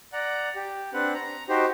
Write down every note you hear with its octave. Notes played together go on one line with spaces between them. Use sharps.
D5 F#5 A#5
G4
C4 D4 B4 F#5
A#5
D#4 F#4 G4 C5